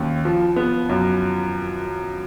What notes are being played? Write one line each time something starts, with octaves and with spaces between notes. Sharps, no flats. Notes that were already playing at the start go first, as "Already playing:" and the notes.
Already playing: D#2 C#4
F3
B3
F#2